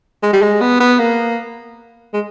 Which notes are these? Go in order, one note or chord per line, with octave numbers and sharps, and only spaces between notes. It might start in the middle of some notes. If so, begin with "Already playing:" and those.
G#3
G3
G#3
B3
B3
A#3
G#3